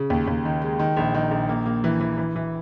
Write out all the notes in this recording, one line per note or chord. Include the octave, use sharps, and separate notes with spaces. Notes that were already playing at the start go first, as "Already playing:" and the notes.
Already playing: C#3
D#2
D#2
D#3
G#3
D#3
A#1
D#3
A#1
A#3
A#3
E3
E3
E3
E3